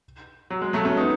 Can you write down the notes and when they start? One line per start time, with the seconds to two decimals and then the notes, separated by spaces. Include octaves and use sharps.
0.50 F#3
0.62 G#3
0.73 F#3 A3
0.85 A3 C#4
0.97 B3 D#4